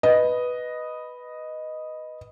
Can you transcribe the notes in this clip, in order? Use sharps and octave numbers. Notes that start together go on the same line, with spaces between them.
B4 D#5